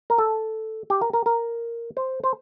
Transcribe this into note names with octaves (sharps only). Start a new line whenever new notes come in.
A#4
A4
G4
A#4
A#4
A#4
C5
C5